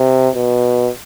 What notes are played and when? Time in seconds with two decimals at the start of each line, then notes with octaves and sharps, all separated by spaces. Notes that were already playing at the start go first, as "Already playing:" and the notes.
Already playing: C3
0.35 B2